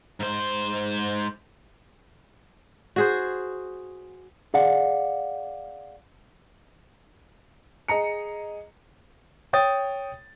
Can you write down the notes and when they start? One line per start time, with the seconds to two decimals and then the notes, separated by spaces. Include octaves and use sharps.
0.20 G#2 C5
2.96 F#4 G#4 C5
4.54 G#4 D5 F5 F#5
7.88 G#4 D#5 A#5 C#7
9.53 C#5 G5 D#6 A6